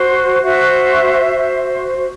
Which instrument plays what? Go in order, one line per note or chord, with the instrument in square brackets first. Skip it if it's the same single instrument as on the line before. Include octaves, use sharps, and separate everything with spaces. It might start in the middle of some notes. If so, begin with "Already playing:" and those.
Already playing: [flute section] F#4 C5
F#4 C5 E5
F#4 C5